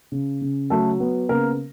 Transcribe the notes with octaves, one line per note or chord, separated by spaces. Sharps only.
C#3
C#3
F#3 A3 A4
B3
C#3 A#3 A#4